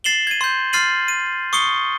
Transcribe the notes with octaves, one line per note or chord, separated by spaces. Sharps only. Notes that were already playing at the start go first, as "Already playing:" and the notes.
A6 C7 E7 F#7 G7
G#6 D#7
C6 G6
C6 F6 A6 C7 D#7 F#7
D#7
C#6 D#6 C7 C#7 G7